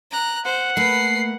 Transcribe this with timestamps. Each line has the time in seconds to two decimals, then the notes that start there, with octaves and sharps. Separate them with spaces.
0.11 A#5 F#6
0.45 C5 F#5
0.77 A3 A#3 B4 B5 C7